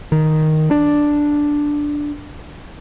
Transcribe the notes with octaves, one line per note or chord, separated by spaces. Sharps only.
D#3
D4